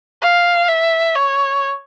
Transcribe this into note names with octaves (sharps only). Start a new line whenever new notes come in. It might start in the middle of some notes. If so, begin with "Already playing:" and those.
F5
E5
C#5